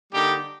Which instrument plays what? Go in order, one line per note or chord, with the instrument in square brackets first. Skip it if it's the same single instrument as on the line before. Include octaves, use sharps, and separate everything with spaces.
[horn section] D3 G3 A#3 D#4 G4